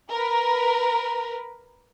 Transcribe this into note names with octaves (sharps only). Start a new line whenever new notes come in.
A#4 B4